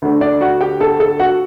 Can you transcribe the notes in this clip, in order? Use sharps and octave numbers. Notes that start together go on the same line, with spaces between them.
D2 D3 A3 D4
D4 D5
F#4 F#5
G4 G5
A4 A5
A4 A5
F#4 F#5